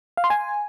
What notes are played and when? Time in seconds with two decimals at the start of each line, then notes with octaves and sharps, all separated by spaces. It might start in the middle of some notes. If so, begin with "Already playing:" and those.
0.17 F5
0.24 C6
0.30 G#5